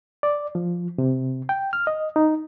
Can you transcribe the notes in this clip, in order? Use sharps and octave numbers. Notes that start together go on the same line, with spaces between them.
D5
F3
C3
G5
F6
D#5
D#4